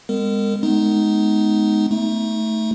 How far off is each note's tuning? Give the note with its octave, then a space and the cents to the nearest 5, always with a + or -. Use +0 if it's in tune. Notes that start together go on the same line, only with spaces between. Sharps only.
G#3 -25 B3 +35 A#4 -30
G#3 +40 B3 +25 D#4 +0
A3 +0 D#4 +30